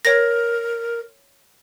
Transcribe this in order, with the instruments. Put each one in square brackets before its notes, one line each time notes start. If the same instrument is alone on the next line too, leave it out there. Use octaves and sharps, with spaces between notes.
[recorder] A#4 [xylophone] C#5 A#6